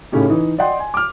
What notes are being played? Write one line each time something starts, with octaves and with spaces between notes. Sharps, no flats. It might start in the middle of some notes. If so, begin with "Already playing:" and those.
A2 C#3 C#4 D#4 G4
E3 D#4
D5 D#5 F#5 G5 C6
G#5
D6 F6